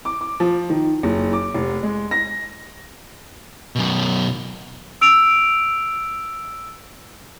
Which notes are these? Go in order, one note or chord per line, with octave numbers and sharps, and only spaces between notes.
D6
D6
F3
D#3
F#1
D6
F1
G#3
A#6
F#2 B2
E6 D7 F7